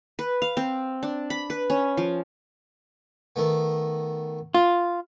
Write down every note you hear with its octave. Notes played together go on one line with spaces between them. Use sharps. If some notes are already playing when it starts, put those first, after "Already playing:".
B4
F5
C4
D4
B5
B4
C#4
F3
D#3 A3 B3
F4